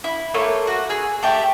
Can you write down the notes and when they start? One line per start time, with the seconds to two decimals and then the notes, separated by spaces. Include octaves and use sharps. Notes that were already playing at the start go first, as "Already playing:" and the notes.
0.04 E4
0.34 A3 A#3 C#5
0.67 F#4
0.89 G#4 E6
1.23 A3 G4 E5